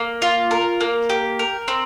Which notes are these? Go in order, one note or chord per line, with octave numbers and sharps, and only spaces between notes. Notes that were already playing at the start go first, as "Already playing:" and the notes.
Already playing: A#3
F4
A#4
A#3
G4
A#4
C4